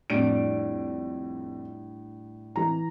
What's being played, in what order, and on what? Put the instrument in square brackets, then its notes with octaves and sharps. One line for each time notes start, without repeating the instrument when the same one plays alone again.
[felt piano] F2 D7 [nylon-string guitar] A2 G3 D4
[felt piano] E3 A#5